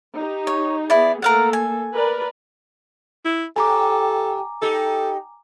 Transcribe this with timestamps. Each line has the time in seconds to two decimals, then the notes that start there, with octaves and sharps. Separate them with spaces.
0.15 D#4 G4
0.47 C#5
0.90 B3 E4 G#4 D5
1.22 A3 A#3 A4 A#4 F5 F#5
1.53 G#5
1.94 A#4 B4 D5
3.25 E4
3.56 A2 G4 A4 G#5 A#5 D6
4.62 D#4 G4 A4